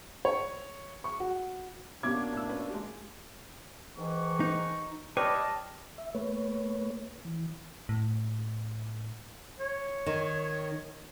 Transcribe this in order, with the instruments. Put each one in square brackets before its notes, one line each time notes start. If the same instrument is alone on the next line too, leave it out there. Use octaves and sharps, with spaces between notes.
[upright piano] C#5
C#6
F#4
[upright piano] B2 D6 G#6 [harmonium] A#3 D4 [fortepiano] C#4 G4
[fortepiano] A2 E6
C#4 B4
G#3 G4
[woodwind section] G#2 D#3 E3 [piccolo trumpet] C#6
[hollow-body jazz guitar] D#4
[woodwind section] G3 D#5 [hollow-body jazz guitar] B4 C#5 [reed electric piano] G5 D6 F6 [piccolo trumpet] A5
[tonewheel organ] E5
A3 A#3 B4 C#5
E3
[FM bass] A2
[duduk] C#5
[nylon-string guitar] D#3